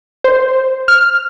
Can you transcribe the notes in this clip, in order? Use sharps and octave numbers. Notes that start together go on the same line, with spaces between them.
C5
F6